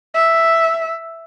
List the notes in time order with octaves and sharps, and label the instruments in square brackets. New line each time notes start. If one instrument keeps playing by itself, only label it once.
[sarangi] E5